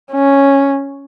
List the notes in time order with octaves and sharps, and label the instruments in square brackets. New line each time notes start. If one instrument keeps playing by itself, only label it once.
[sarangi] C#4